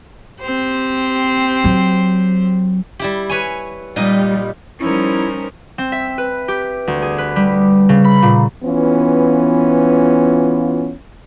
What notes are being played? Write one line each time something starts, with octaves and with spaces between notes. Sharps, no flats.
C4 G4 C5
F#3
G3 E4 G4
B4 C#5 G#5
A#2 G3 D#4 D#5
F3 G3 C#4 D#4 E4 A#4 C5
C4
E5
B4
G4
D2
G#4
B4
G3
C#3
B5
A#2
E3 B3 C#4 F4